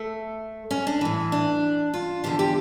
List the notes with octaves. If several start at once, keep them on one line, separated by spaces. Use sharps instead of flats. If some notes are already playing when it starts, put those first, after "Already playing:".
Already playing: A3
C#4
D4
A2 E3
D4
F4
E2 D3 F3 G4
G4